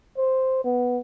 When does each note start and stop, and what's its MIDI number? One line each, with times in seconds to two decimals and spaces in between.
0.18 0.62 72
0.64 0.98 59